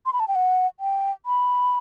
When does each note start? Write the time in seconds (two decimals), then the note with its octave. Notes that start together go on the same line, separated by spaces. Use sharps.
0.06 C6
0.13 B5
0.20 A5
0.28 G5
0.35 F#5
0.80 G5
1.26 B5